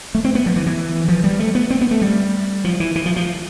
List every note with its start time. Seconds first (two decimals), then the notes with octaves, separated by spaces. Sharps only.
0.15 A3
0.25 C4
0.35 B3
0.46 F3
0.56 E3
0.66 E3
1.08 F3
1.24 G3
1.40 A3
1.55 B3
1.70 C4
1.81 B3
1.91 A3
2.02 G3
2.64 F3
2.80 E3
2.96 E3
3.06 F3
3.16 F3